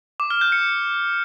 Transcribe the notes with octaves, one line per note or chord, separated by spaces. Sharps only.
D6
F6
G6
C#7